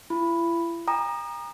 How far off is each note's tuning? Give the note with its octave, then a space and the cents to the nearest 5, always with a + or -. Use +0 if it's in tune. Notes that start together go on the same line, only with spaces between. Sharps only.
E4 +40 B5 +0
G5 +45 A#5 +15 D#6 -35